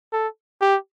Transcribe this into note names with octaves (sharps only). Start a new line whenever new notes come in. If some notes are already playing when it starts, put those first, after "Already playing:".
A4
G4